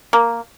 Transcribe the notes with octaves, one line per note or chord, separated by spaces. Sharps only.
A#3